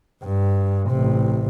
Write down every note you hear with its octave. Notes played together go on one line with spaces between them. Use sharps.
G2
A1 C3